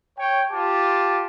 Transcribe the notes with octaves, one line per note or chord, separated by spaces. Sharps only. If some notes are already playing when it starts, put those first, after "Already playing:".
C#5 G5
F4 G4 A5 D6